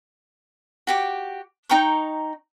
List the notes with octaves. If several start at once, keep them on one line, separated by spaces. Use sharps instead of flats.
F#4 G4 D6
D#4 G5 A#5 C#6